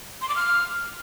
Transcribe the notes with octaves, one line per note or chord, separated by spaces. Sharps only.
C6
D6
F6